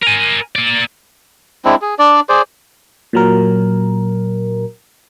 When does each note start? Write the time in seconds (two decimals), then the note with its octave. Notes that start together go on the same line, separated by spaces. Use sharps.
0.03 A#4 G#5
0.56 A#3 D5
1.65 G#3 C4 D4 E4
1.82 G#4
1.99 D4 D5
2.29 G#4 C5 D5
3.13 A#2 F#3 A#4